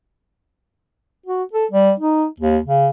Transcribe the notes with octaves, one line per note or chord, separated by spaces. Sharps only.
F#4
A4
G3
D#4
D#2
C#3